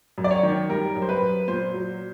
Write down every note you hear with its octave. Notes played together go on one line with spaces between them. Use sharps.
F#2
D5
C#5
D#3
G3 A#4
F#2
C5
B4
F#2
A#2 C5
F#3